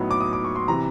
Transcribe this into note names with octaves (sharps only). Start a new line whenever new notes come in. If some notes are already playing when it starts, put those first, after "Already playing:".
Already playing: A2 F#3 B3 D#4
D6
D#6
D6
C#6
C6
C3 E3 A#5